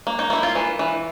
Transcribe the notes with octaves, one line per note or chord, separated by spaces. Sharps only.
A#3
D#4
A#3 E4
F4
E3
E3